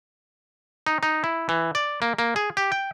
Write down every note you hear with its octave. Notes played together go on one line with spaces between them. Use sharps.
D#4
D#4
E4
E3
D5
A#3
A#3
G#4
G4
G5